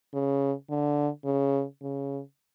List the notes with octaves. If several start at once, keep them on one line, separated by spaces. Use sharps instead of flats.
C#3
D3
C#3
C#3